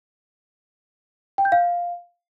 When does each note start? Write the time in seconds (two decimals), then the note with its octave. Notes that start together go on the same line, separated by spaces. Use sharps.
1.38 G5
1.45 G6
1.52 F5